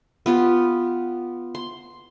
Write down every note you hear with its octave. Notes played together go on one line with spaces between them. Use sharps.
B3 F4 G4
C6